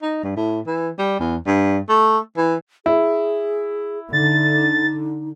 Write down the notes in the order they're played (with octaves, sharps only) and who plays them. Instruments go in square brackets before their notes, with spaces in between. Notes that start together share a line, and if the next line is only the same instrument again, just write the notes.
[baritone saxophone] D#4
G2
A2
E3
G3
E2
G2
A3
E3
[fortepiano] E4 [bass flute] G#4
[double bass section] D3 [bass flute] D#4 [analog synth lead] A6